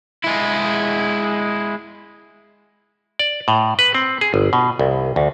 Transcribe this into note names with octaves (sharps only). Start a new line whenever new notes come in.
G#3 E4
D5
A2
B4
C4
G#4
G1
B2
C2
D2